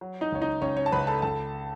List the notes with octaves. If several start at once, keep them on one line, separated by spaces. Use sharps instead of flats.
F#3
D#4 D#5
C#2 C#5
D#4 D#5
C#2 C#4 C#5
C#4 C#5
A5
C#2 B4 B5
A4 A5
C#2 A4 A5